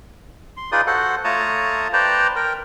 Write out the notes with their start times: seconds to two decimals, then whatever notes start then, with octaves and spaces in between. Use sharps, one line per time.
0.57 C6
0.72 D#4 F4 G#4 B4 D5 D#6
0.87 F#4 A4 C5 F#5
1.24 A3 F4 C#5 A5 A#5 D#6
1.93 B4 C5 D5 G5 A5 A#5
2.36 A#4 G5